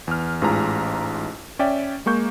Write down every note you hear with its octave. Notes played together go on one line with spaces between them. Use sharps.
E2 F6
A1 G#2 F4 G#4 A#5
C#4 D5 E5 G5
G#3 A#3 C#6 G6